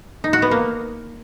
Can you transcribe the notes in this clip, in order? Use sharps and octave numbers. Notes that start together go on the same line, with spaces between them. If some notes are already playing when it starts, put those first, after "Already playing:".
D#4
F#4
B3
A#3